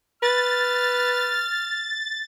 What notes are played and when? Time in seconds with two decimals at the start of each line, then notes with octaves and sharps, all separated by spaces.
0.23 B4 F6 A6